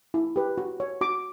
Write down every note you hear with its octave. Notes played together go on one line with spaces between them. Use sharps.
E4
G4 B4
F#4
C#5
F#4 D6